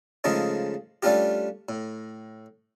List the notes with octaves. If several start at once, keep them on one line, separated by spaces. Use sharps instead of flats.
C#3 F3 G#3 A3 C#4 D#4
G3 A3 C#4 D4 F4 G4
A2